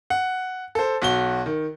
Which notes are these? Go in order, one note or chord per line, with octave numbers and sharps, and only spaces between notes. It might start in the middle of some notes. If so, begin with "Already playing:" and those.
F#5
A4 C5
B1 F#4 G7
D#3